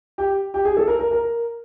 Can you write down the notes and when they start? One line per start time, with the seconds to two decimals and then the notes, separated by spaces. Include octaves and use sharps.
0.18 G4
0.54 G4
0.65 G#4
0.77 A4
0.88 A#4
0.99 A#4
1.11 A#4